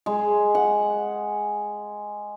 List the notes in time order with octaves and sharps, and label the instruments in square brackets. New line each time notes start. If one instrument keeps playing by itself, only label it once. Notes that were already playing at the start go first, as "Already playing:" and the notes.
[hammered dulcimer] G#3
F#5